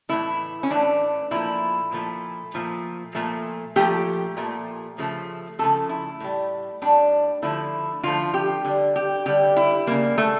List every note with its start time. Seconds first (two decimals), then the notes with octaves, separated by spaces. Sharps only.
0.09 A2 E3 A3 E4
0.63 C#4
0.70 A2 E3 A3 D4
1.31 A#2 F3 A3 E4
1.93 A#2 F3 A3
2.54 A#2 F3 A3
3.15 A#2 F3 A3
3.76 A#2 F3 A3 G4
4.37 A#2 F3 A3
4.98 C#3 F3 A3
5.59 C#3 F3 A3 A4
5.89 E4
6.21 A2 G3
6.82 A2 G3 D4
7.42 D3 F3 A3 E4
8.03 D3 F3 A3 F4
8.34 G4
8.65 D3 G3
8.96 G4
9.26 D3 G3 G4
9.57 E4
9.87 C#3 G3 A#3
10.18 A3